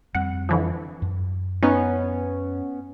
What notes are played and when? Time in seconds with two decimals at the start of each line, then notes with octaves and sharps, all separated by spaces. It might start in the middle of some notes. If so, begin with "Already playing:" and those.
0.15 F2 G3 C4 F#5
0.49 D3 E3 F3
1.02 F#2
1.63 B3 C#4 D#4